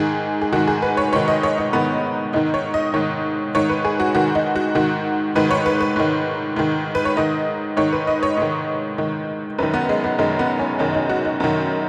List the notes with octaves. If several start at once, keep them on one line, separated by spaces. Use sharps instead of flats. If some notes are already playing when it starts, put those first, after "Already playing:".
Already playing: G#2 D#3 G#4
G#4
G#2 D#3 F#4
G#4
B4
C#5
G#2 D#3 C#5
D#5
C#5
D#4
G#2 D#3 B3
G#2 D#3 D#4
C#5
D#5
G#2 D#3 C#5
G#2 D#3 C#5
B4
G#4
F#4
G#2 D#3 F#4
D#4
F#4
G#2 D#3 F#4
G#2 D#3 B4
C#5
B4
B4
G#2 D#3
G#2 D#3
B4
C#5
G#2 D#3 D#5
G#2 D#3 C#5
B4
D#5
C#5
G#2 D#3
G#2 D#3
F#2 D#3 B4
B3
G#3
B3
F#2 D#3 G#3
B3
C#4
F#2 D#3 D#4
D#4
F#4
D#4
F#2 D#3